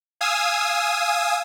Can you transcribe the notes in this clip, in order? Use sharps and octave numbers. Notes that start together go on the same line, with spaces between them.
F5 G#5 D#6 E6